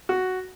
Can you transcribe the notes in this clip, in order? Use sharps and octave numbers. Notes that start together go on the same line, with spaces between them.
F#4